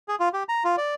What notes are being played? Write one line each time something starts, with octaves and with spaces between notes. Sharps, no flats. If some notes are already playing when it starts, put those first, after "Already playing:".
G#4
F4
G4
A#5
F4
D5